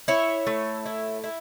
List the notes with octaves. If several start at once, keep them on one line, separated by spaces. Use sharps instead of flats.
E4 C#5 E5
A3
E4
E4